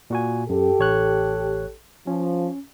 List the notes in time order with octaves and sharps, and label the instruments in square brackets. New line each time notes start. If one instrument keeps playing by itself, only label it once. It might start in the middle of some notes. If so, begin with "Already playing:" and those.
[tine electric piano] A#2 F#4 G#5
[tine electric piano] F#2 [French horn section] G4 A4
[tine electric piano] A1 C#5 F#6
[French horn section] F3 [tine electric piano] C#4